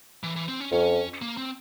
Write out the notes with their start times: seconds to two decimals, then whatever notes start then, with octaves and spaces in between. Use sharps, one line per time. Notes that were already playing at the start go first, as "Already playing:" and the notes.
0.23 E3
0.36 E3
0.48 C4
0.60 C#4
0.72 F2 C#4
1.22 A#3
1.37 C4